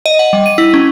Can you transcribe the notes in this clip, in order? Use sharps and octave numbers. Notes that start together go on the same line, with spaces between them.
D#5
F#5
G3
D#7
E4
C#4